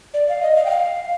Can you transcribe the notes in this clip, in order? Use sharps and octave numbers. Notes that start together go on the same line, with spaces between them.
D5
F5
D#5
F5
G5
F5